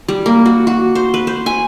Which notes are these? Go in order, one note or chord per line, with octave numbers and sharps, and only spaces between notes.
G3
A#3
F#4
F#4
C5
B4
C5
G#5